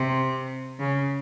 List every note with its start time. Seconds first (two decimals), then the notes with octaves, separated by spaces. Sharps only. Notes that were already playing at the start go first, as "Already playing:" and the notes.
Already playing: C3
0.79 C#3